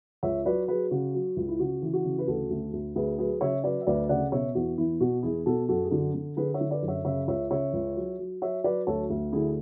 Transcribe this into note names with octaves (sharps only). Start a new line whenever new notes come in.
C#2 C#5 E5
F#3 B4 D5
F#3 G#4 B4
C#3 F#4
F#3
C#2
E4
C#3 F#4
E3
F#4
C#3
B4
D2 F#4 A4
D2
D2
D2 G#4 B4
F#3 G#4 B4
C#3 C#5 E5
F#3 B4 D5
E5
D2 B4 D5
C#3 D5 F#5
B2 C#5 E5
E2 F#4
E2 E4
B2 F#4
E2 E4 G#4
B2 F#4 A4
F#2 F#4 A4
G#4
D3 F#4
D3
D3 G#4 B4
C#5 E5
D3
B4 D5
F#2
C#5 E5
C#3 C#5 E5
C#2 C#5 E5
C#3 C#5 E5
C#2
F#3
F#3
F#3 C#5 E5
F#3 B4 D5
D2 A4 C#5
D2
D3 E4 G#4